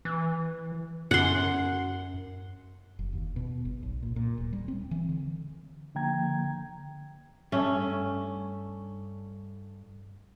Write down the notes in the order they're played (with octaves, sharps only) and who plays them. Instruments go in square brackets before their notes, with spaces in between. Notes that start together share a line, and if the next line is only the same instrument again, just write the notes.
[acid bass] E3
[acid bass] F#2 [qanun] F#5 C6
[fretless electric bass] F#1
D#2
B2
G1
B1
A#2
A#2
D1
G3
C4
E3
D3
[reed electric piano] D3 F3 A#3 G5 A#5 G#6
[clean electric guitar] G2 [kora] A3 C#4